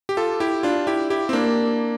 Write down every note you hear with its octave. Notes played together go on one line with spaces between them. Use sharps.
G4
F4 A4
E4 G4
D4 F4
E4 G4
E4 G4
C4
A#3 D4